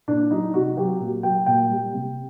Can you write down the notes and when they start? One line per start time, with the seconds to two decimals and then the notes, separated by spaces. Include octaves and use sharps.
0.08 A#2 D4
0.31 F#3 D#4
0.54 C3 F#4
0.77 F#3 G4
1.00 A#2
1.23 F#3 G5
1.46 A#2 G5
1.69 G3
1.93 C3